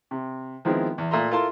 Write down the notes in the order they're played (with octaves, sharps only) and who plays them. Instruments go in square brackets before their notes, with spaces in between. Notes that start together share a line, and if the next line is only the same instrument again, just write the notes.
[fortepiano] C3
D#3 F3 G#3 B3 C4 E4
E2
A#2 A3 A#5 C6
E4 F4 A4 A#4 A5 C6